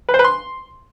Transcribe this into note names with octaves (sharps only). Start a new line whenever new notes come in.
B4
C5
B4
C6